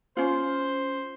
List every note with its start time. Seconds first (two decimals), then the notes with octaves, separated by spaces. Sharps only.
0.17 C#4 F4 C5